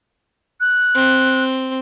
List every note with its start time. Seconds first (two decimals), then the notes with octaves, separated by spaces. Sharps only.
0.60 F#6
0.95 C4